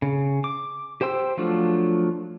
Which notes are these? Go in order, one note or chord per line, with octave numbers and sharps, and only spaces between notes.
C#3
D6
G4 C5 G5 C6 E6
F3 F#3 A3 D4 F4